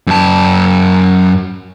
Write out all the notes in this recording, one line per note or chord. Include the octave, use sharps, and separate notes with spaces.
F#2 A5